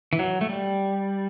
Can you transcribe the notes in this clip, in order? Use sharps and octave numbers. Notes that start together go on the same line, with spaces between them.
E3
F#3
A3
G3